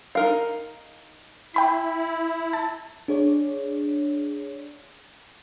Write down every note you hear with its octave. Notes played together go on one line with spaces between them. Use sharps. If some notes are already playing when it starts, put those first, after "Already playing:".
D#4 A#4 F5
E4 G5 B5 B6
A5
D4 G#4 C#5 D5